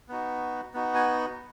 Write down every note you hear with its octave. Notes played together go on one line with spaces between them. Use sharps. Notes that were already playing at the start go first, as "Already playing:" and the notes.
B3 D#4 F#4
B3 D#4 F#4
G#5